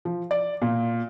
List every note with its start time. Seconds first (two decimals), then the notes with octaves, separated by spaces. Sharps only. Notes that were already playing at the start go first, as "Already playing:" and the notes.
0.05 F3
0.31 D5
0.62 A#2